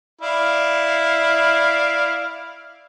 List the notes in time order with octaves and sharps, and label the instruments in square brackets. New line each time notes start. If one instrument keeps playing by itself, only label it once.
[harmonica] E4 D5 F5